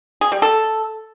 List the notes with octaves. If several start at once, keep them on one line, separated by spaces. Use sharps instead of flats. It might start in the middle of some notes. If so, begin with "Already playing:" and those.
G#4
G3
A4